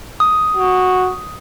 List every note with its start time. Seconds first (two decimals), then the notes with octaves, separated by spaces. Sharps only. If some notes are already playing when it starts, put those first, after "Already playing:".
0.20 D#6
0.57 F#4